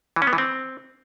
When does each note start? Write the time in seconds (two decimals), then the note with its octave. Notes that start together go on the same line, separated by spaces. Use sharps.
0.16 E3
0.22 C#4
0.27 B3
0.33 E3
0.38 C4